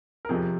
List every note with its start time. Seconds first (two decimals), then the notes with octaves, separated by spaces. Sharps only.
0.25 A#4
0.29 F2 C3 F3 G#4